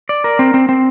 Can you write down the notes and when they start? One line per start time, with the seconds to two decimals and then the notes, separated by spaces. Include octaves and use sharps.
0.09 D5
0.24 A#4
0.39 C4
0.54 C4
0.69 C4